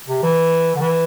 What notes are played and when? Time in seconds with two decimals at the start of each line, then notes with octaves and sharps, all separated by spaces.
0.08 C3
0.23 E3
0.76 D3
0.81 E3